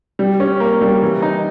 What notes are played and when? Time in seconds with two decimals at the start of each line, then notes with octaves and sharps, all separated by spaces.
0.19 G3
0.40 C#4
0.60 A#3
0.81 G3
1.02 E3
1.22 D#4